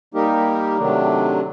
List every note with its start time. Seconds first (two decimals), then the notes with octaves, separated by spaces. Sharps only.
0.14 G3 A#3 D#4 G4 A#4
0.78 C3 D#3 F#3 A3 D4